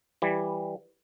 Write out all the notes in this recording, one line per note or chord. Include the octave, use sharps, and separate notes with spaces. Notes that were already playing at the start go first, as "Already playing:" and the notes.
E3 G3